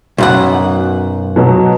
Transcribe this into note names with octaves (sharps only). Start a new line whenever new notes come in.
B1 F#2 F#5
B2 F#3